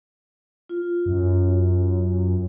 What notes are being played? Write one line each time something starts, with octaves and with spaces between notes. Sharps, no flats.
F4
F#2